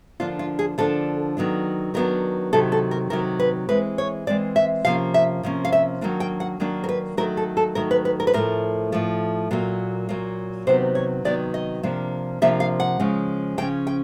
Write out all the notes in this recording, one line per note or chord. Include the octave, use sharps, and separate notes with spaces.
D3 F3 A#3 D4 F4
F4
G#4
D3 F3 A#3 D4 A4
D#3 F#3 B3 D4
D#3 F#3 B3 D4 A#4
C3 D#3 F#3 A4
A4
A#4
C3 D#3 F#3 A#4
B4
E3 G#3 C4 B4
C#5
E3 G#3 C4 D5
E5
C3 F3 A#3 C#4 F5
E5
C3 F3 A#3 C#4
F5
E5
D#3 F#3 A#3 D4
G5
F#5
D#3 F#3 A#3 D4
A#4
B4
D#3 F#3 A3 A#4
A4
A4
D#3 F#3 A3 A#4
B4
B4
A#4
B4
A2 F3 A3 A#4
A2 F3 A3
A#2 F#3 A#3
A#2 F#3 A#3
C3 D#3 F#3 B3 C5
C#5
C3 D#3 F#3 B3 D5
D#5
C3 F3 A#3 D4
C3 F3 A#3 D4 E5
F5
F#5
C#3 F3 G#3 C#4
C#3 F3 G#3 C#4 G5
G5